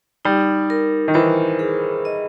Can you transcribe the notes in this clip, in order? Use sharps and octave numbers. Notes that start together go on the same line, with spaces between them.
G3 D#4
A#4
D#3
E3 C5
G#4
D#5